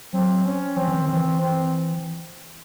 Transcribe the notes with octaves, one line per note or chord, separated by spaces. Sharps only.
F#3 C4
C#4
F3 C4
E3
D#3
C4
E3
C4